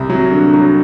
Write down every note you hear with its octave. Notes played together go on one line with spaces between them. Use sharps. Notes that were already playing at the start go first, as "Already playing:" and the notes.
Already playing: C2
F#3
D3
F#3